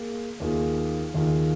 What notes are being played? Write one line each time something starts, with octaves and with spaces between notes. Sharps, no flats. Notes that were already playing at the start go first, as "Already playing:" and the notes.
Already playing: A#3 G#4
D#2 D#3 A#3 F4 G#4
D#2 D#3 A#3 F4 G#4